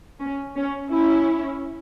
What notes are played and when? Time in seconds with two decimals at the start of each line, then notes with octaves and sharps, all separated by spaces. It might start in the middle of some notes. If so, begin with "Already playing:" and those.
0.20 C#4
0.56 C#4
0.90 C#4 E4